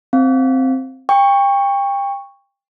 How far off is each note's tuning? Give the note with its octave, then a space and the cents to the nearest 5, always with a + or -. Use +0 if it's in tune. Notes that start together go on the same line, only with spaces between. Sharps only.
C4 +0 F5 +0
G5 +30 C#6 +0